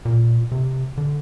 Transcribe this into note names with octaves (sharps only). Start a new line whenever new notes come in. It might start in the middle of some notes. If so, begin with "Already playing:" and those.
A#2
C3
D3